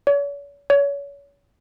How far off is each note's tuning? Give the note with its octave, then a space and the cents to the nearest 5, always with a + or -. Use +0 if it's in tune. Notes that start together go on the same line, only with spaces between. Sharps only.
C#5 +45
C#5 +30